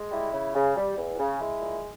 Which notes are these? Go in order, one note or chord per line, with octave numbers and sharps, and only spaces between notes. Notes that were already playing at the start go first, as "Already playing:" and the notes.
Already playing: G#3
G3 E4
C#3
C#3
G3
E2
C#3
G#3 E4
A#2